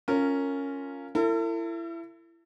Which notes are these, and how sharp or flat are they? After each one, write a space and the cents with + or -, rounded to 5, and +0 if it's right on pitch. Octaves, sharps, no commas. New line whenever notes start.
C#4 +0 F4 +0 A#4 -20
E4 +25 A4 +45